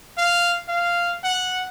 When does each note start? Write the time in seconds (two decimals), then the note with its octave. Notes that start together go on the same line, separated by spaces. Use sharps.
0.18 F5
0.68 F5
1.24 F#5